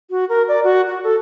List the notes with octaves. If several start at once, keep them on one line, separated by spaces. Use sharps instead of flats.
F#4
A#4
D5
F#4
F#4
A4